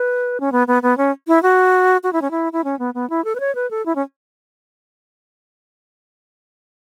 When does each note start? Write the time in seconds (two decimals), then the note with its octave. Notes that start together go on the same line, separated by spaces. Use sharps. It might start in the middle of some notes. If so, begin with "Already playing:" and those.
Already playing: B4
0.40 C#4
0.52 B3
0.67 B3
0.83 B3
0.98 C#4
1.28 E4
1.43 F#4
2.03 F#4
2.13 E4
2.22 C#4
2.31 E4
2.53 E4
2.64 C#4
2.79 B3
2.94 B3
3.10 E4
3.25 A4
3.35 B4
3.40 C#5
3.55 B4
3.71 A4
3.86 E4
3.96 C#4